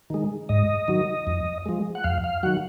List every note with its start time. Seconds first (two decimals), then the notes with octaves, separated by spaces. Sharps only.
0.10 D#3 G#3
0.49 G#2 D#5
0.88 D#3 F#3
1.27 F2
1.66 F3 G#3
1.95 F#5
2.04 F2 F5
2.24 F5
2.43 D#3 F#3 F#5